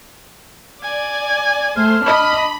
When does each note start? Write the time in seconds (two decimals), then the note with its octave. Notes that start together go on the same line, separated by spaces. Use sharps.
0.83 D5 G#5
1.76 A3 C5 F6
2.06 D4 D#5 B5